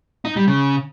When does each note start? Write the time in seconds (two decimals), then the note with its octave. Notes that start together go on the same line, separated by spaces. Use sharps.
0.25 D#4
0.36 G3
0.48 C#3